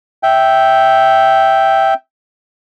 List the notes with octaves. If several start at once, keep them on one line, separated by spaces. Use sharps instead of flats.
E5 G5